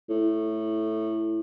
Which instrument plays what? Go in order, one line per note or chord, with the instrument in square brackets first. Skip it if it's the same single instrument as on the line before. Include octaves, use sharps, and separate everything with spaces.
[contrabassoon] A2